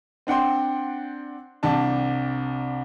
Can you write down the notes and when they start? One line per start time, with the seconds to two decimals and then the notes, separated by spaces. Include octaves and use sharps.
0.27 C4 D4 F#5 G5 C6
1.63 C2 C3 D4 A5